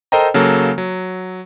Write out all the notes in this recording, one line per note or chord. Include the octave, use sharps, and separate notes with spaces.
A4 A#4 C5 D#5 G5 A#5
C#3 F#3 A#3 A4
F#3